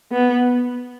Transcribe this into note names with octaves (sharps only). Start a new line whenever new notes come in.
B3